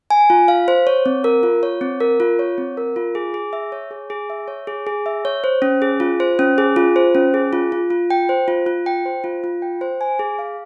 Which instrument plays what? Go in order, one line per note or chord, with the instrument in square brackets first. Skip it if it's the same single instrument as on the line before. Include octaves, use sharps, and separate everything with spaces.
[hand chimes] G#5
F4
F5
C5
C#5
C4
A#4
F4
C#5
C4
A#4
F4
C#5
C4
A#4
F4
G#4
G#4
E5
C#5
G#4
G#4
E5
C#5
G#4
G#4
E5
C#5
C5
C#4
G#4
F4
C5
C#4
G#4
F4
C5
C#4
G#4
F4
F4
F4
G5
C5
F4
F4
G5
C5
F4
F4
G5
C5
G#5
G#4
F5